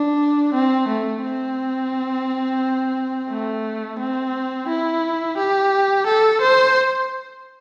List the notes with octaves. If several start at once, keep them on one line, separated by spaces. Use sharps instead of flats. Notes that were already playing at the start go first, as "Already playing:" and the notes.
Already playing: D4
C4
A3
C4
A3
C4
E4
G4
A4
C5